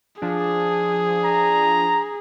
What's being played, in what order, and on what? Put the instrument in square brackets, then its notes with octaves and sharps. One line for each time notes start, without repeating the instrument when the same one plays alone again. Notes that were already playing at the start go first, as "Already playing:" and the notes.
[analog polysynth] F3 D4 [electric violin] G#4
[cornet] A#5